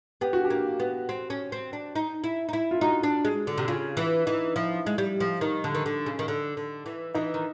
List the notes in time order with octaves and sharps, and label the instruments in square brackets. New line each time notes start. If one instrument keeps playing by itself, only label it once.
[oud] B3 [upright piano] G4
[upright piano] F#4
G4
[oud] A#3
B3
C4
C#4
C4
D4
D#4
E4
D#4
E4
[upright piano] F4
[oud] D#4 [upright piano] F#4
[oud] D4
G#3
D3
C3
[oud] C#3 [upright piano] F4
[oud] E3 [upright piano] E4
[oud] E3 [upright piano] D#4
[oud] F3 [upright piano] E4
[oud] G#3
G3
F3
[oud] D#3 [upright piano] D#4
[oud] D3
D#3
D3
C#3
D#3
D3
D3
E3
[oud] E3 [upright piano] D#4
[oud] D#3